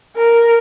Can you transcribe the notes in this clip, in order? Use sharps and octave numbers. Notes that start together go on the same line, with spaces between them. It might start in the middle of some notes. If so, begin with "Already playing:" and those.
A#4